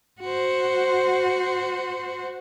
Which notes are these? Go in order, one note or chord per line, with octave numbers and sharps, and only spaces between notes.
F#4 C5